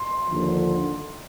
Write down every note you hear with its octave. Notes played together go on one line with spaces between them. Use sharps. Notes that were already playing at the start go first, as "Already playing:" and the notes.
Already playing: C6
D#2 D3 F3